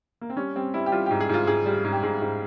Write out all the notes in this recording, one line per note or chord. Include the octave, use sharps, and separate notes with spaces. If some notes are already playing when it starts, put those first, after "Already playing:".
A#3
C4
G3 C#4
G3 C4
G3 E4
G4
G3 F4
G#2 G4
G#4
G#2 F4
G#2 G#4
G3
G#2
G4
G#2 G#4
G#2